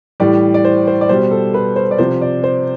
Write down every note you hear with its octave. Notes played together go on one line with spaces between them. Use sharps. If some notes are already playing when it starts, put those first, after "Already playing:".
A2 E3 G3 D5
D5
C5
C5
D5
B2 G3 C5
A4
B4
C5
D5
C3 F3 C5
D5
C5